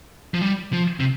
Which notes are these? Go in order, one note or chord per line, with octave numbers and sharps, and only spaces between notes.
F3
G3
F3
C3